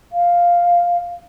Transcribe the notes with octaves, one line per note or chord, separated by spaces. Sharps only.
F5